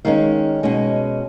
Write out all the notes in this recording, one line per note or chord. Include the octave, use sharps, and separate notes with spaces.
D#3 G#3 C#4 F5
B2 G#3 C#4